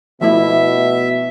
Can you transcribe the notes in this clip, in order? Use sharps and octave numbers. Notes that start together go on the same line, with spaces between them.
B2 F3 A3 E4 E5